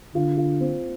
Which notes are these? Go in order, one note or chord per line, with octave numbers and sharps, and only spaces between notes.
D3 F4
F4
C4